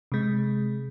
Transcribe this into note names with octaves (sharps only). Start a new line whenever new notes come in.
C3 G#3